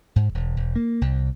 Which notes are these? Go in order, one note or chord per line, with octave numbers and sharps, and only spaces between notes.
G#2
E1
E1
A#3
C2